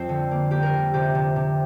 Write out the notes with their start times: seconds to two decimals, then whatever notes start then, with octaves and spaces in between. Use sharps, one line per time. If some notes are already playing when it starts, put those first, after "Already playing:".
Already playing: F2 C4 C5
0.09 D3
0.31 A#3
0.51 A#3 G4
0.63 A#4
0.74 D3
0.94 C3 G4
1.15 C3
1.36 C3